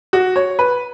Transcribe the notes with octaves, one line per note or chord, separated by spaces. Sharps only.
F#4
C#5
B4